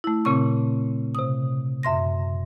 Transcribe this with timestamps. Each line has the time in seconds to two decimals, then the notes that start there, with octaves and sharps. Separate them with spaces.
0.04 A3 E4
0.25 A#2 C#3 C4 C#6
1.15 C3 D#6
1.83 F#2 E5 C6 A#6